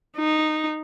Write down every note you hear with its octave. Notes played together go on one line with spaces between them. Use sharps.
D#4